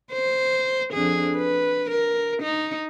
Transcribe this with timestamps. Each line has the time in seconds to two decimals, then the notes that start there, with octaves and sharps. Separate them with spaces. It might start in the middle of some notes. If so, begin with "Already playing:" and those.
0.12 C5
0.93 F2 D4 G#4
1.37 B4
1.90 A#4
2.42 D#4